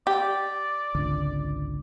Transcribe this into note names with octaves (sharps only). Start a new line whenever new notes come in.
G4 D5
G#1 C#2 D3